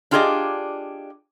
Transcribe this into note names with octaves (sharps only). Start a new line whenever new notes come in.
D4 F4 G4 G#4 D5 D#5